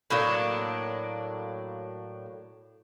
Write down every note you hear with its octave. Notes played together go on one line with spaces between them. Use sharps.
A2 F#3 A#3 D4